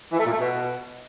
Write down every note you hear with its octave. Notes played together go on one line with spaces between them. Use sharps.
E3
A3
A#2
A3
B2